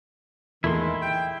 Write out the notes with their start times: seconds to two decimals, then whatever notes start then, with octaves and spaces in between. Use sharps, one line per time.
0.64 E2 A#2 D#3 G#3 A3 E4 C6
1.02 G5